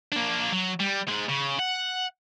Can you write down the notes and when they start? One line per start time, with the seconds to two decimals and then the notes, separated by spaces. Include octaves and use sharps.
0.12 A#3 D4
0.53 F#3
0.80 G3
1.08 G#2 G#3
1.29 C#3
1.59 F#5